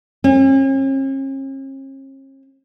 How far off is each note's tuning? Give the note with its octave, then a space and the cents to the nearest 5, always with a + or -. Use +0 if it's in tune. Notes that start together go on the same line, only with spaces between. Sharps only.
C#4 -45